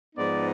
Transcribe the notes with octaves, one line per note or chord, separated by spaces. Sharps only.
G#2 F3 G#3 B3 D#4 D5